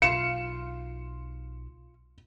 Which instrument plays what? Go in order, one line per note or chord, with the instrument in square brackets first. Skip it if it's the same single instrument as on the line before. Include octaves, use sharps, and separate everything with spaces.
[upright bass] B1 [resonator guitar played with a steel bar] F4 F5 [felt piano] C#7 E7